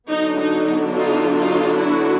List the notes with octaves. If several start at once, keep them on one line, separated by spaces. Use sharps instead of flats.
D3 F#3 B3 D4 D#4
D#4
D#4 F4
D#4 F4
E4 F#4